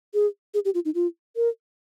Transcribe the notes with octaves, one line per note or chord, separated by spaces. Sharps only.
G#4
G#4
G4
F4
D#4
F4
A#4